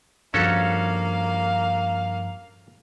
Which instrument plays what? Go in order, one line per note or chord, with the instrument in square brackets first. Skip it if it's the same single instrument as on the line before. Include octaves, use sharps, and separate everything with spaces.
[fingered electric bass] G2 F3 [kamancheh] A#3 F5 [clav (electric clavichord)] C#4 F#4 A4